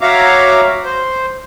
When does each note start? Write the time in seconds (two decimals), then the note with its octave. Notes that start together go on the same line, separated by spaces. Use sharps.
0.01 F#4 C#5 E5 F5 A#5 D6
0.85 C5